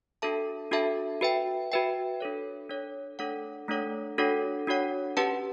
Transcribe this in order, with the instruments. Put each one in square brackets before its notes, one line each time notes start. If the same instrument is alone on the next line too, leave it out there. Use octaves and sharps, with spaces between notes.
[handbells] D4 F#4 A4 E5 A5
D4 F#4 A4 E5 A5
F#4 B4 E5 G5
F#4 B4 E5 G5
D4 A4 C#5
D4 A4 C#5
A3 D4 A4 C#5 F#5
A3 D4 A4 C#5 F#5
D4 F#4 A4 C#5 F#5
D4 F#4 A4 C#5 F#5
C#4 G4 B4 F#5 A5